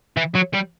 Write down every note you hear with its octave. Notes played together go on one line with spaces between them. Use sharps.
E3
F#3
G3